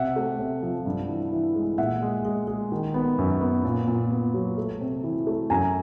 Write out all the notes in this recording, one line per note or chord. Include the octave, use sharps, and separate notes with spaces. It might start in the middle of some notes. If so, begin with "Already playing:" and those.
Already playing: C3 E5 F#5
A3
C3
F3
G2
E3
E3
G#3
A#2 E5 F#5
G#3
G#3
G#3
D#3
B3
F#2
B3
A#2
A#2
B3
F#3
A3
C3
E3
A3
F#2 G#5 A#5